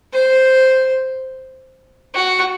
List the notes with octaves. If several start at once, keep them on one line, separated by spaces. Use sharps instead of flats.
C5
F#4